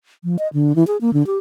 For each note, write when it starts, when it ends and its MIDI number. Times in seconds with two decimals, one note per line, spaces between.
0.24 0.36 53
0.39 0.48 75
0.53 0.75 50
0.76 0.86 52
0.87 0.97 68
1.01 1.13 58
1.13 1.25 50
1.26 1.39 67